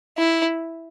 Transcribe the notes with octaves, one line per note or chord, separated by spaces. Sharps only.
E4